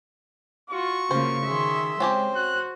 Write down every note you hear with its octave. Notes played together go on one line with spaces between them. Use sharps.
F4 F#4 C#6
C#3 A#3 F4 C5
D#3 G#4 E5 C6
G#3 C4 C#4 G4 C5
F#4 F#6